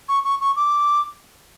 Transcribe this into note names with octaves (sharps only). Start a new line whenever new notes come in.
C#6
C#6
C#6
D6